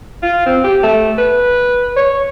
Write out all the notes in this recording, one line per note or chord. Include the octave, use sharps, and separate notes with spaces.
F4
C4
G4
A3
B4
C#5